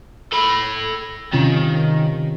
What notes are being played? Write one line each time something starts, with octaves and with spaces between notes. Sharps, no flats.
A4 B5
C3 D#3 C#4 F4